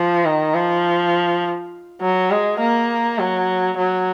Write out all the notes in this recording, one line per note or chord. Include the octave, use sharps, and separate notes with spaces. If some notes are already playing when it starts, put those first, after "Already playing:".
Already playing: F3
D#3
F3
F#3
G#3
A#3
F#3
F#3